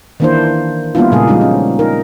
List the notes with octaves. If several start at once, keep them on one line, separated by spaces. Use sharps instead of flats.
D#3 E3 A#3 D4 E4 C5
G3 A#3 B3 D4 E4 F4
A#2 C#3 G3 G#3 A#3 G#4
F3 G3 G#3 D#4
C#4
D#4 A#4